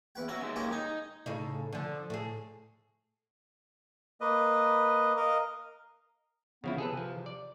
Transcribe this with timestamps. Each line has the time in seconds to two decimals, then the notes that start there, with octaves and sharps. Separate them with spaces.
0.15 E2 B4 G5
0.29 C#4 F#4 E5
0.41 D#2 G#3
0.56 A#3 C#4 G4
0.72 D#4 G#5
1.26 A2 C#3 D#4
1.73 D3 F3
2.10 A2 G#4
4.21 A#3 B4 D#5
5.17 A#4 D#5 F5
6.64 C#3 F3 B3 E4
6.78 C3 G#4 A4 B4
6.97 F3
7.26 D5